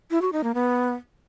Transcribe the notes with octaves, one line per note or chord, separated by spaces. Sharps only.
E4
F#4
D#4
A#3
B3